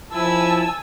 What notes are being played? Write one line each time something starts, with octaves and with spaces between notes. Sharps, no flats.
F3 E4 G#5 A5 E6